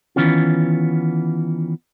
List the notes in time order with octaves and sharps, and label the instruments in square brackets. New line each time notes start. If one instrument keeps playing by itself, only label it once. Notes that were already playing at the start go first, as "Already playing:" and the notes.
[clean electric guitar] D#3 E3 B3 C#4 F4